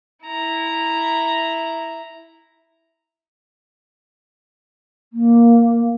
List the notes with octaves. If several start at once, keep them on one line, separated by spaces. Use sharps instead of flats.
E4 A#5
A#3